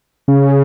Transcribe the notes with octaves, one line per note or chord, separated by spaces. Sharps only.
C#3